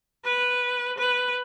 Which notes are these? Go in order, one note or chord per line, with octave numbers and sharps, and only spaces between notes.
B4
B4